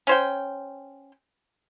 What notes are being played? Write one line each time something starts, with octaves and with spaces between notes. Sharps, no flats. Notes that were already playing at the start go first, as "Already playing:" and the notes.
C#4 C5 G5